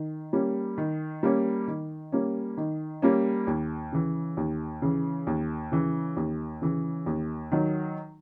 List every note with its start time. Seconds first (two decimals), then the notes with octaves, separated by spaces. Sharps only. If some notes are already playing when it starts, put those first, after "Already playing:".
Already playing: D#3
0.33 G3 A#3 C#4
0.78 D#3
1.23 G3 A#3 C#4
1.68 D#3
2.12 G3 A#3 C#4
2.57 D#3
3.02 G3 A#3 C#4
3.47 D#2
3.92 C#3 E3
4.37 D#2
4.82 C#3 E3
5.27 D#2
5.72 C#3 E3
6.17 D#2
6.62 C#3 E3
7.06 D#2
7.52 D#3 F#3